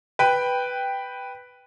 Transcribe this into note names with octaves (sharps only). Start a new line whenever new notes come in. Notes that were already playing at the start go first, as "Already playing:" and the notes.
B4 G5